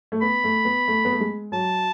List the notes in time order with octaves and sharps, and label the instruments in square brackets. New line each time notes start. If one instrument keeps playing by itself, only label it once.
[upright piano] A3
[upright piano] B3 [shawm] B5
[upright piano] A3
B3
A3
B3
A3
G#3
[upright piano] F#3 [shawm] A5